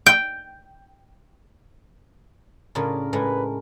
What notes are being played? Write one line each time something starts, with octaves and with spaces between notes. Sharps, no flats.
G5
A2 C#3 D4 F4 A#4 B5
A2 G#3 A3 B4